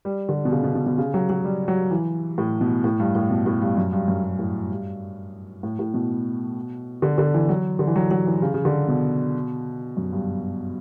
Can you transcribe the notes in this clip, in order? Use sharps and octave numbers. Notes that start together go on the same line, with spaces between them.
G3
D3
B2
C#3
B2
B2
B2
C#3
F#3
F#3
G3
F#3
E3
A2
B2
A2
G2
A2
B2
A2
G2
F#2
G2
F#2
G2
A2
G2
A2
A2
B2
D3
D3
E3
F#3
D3
E3
F#3
F#3
E3
C#3
C#3
D3
B2
F#2
G2